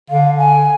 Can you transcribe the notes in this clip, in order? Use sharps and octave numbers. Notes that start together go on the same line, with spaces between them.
D3 F5
G#5